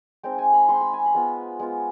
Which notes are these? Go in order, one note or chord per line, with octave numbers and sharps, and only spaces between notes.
G#3 C4 D#4 G5
G#5
B5
G#3 C4 D#4 C6
B5
G#5
B5
G#3 B3 F4
G#3 B3 F4